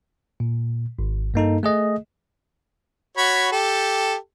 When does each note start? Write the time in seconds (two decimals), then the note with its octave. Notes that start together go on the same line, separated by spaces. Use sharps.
0.40 A#2
0.99 G#1
1.34 G2 A#3 D#4 A4
1.63 A3 G#4 D#5
3.17 F#4 C#5 B5
3.52 G4 A4